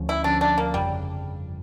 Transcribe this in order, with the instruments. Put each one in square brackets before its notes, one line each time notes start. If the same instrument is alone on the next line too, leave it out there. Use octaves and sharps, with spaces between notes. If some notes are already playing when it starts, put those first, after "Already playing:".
Already playing: [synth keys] D2 D3 F3 C#4
[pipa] E4
[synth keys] D2 D3 F3 C#4 [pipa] D4
[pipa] D4
A#3
[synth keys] G1 F2 C#3 [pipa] G3